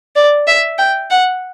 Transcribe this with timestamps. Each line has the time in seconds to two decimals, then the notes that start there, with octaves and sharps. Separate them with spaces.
0.16 D5
0.47 E5
0.78 G5
1.10 F#5